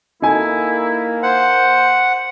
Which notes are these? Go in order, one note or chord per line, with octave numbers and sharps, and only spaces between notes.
A#3 D#4 E4 A4 G#5
C5 F#5